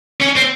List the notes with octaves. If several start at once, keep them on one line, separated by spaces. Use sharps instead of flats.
C#4
C4